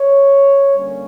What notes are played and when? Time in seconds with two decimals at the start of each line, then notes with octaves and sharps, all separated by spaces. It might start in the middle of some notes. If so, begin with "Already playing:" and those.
Already playing: C#5
0.76 D3 G3 A#3 C#4